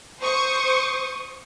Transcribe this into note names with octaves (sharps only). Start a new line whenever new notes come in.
C5 C#6 D#6